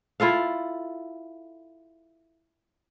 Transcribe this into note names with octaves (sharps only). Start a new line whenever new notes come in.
E4 F4 A4 F5